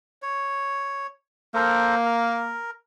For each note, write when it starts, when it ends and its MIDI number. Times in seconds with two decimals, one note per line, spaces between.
0.23 1.07 73
1.54 2.58 58
1.54 1.95 69
1.54 1.95 70
1.54 1.95 72
2.05 2.71 70